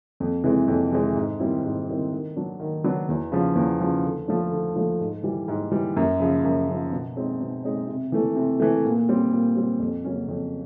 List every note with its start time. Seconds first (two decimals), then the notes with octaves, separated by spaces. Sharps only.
0.20 F2
0.44 C3 E3 G#3
0.68 F2
0.92 C3 E3 G#3
1.16 G#2
1.39 D#3 G3 C4 E4
1.64 G#2
1.88 D#3 G3 C4 E4
2.13 D#3
2.36 F#3 B3 D4
2.60 D#3
2.84 F#3 B3 D4
3.09 E2
3.32 C#3 F3
3.55 E2
3.81 C#3 F3
4.03 D3
4.28 F3 A3 D4
4.52 D3
4.75 F3 A3 D4
5.00 G#2
5.23 E3 G3
5.48 G#2
5.71 E3 G3
5.96 F#2
6.20 C#3 F3
6.44 F#2
6.69 C#3 F3
6.92 B2
7.16 G#3 C4 D#4
7.40 B2
7.65 G#3 C4 D#4
7.87 C3
8.12 E3 A3
8.36 C3
8.60 E3 A3
8.85 A#2
9.09 G3 C4
9.32 A#2
9.56 G3 C4
9.79 F2
10.04 C#3 F#3 A#3 C#4
10.28 F2